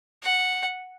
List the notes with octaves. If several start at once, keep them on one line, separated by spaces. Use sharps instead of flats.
F#5